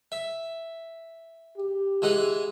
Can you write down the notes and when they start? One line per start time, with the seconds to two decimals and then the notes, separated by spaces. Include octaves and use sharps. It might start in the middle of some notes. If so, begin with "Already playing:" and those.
0.12 E5
1.57 G4
2.02 E3 G#3 F#5